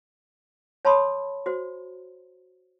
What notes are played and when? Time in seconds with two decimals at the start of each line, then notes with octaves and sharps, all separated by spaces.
0.85 C#5 A5 B5 C6 D#6
1.46 F#4 C5